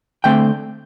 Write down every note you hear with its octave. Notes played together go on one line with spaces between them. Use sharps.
D3 A3 C4 G5